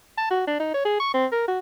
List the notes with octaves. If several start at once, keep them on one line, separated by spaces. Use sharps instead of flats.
A5
F#4
D4
D#4
C#5
G#4
C#6
C4
A#4
F#4